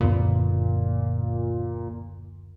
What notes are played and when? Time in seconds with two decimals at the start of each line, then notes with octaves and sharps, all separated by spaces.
0.01 F#1 D2 A#2 B3